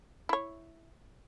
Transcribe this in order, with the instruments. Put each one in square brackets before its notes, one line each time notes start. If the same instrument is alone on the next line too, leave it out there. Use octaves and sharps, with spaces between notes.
[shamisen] E4 C#5